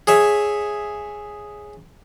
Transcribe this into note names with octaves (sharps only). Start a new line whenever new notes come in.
G#4 C#5 E5